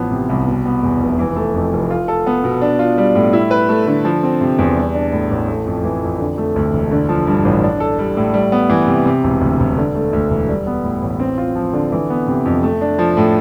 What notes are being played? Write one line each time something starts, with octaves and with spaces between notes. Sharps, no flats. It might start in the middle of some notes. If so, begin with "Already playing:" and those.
Already playing: A1 F3 B3
C3
C2
B2
B3
E2
F1
E3
A3
F2
F1
F4
A4
B3
B2
D4
F4
G3
A2
E4
B4
A3
D3
F3
C4
C3
E2
G3
D4
A2
A1
A3
F2
E3
F2
D3
A3
D2
E1
D3
F3
G2
A1
D4
A4
G3
A2
G3
B3
E3
C3
C3
E1
D2
E1
D3
A3
D2
E1
G3
B3
A2
A1
C4
F4
F3
D3
E3
B3
C3
F2
A3
D4
F3
A2